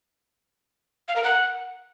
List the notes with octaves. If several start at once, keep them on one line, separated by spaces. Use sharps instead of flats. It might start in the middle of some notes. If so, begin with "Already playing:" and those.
F5
A#4
F#5